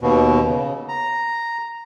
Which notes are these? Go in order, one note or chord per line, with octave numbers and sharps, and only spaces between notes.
D#2 B2
C#3
A#5